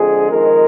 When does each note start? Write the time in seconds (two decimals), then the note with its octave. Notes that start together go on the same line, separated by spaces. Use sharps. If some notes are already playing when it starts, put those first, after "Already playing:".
Already playing: F2 D3 G#3 G#4
0.29 F2 D#3 G#3 A#4